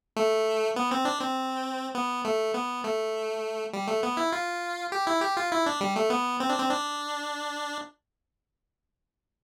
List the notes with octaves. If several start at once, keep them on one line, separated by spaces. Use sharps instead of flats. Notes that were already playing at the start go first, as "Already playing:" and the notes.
A3
B3
C4
D4
C4
B3
A3
B3
A3
G3
A3
B3
E4
F4
G4
E4
G4
F4
E4
D4
G3
A3
B3
C4
D4
C4
D4